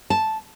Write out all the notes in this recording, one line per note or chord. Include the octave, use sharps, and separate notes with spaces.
A5